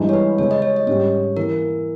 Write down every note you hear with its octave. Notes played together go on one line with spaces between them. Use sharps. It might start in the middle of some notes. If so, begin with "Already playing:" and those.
Already playing: G2 E3 G#3 D#4 G#4
C#5
B4
C#3 G#3 C#4 C#5
D#5
C#5
D#5
G#2 G3 C#4 G4 C#5
E3 A#3 A#4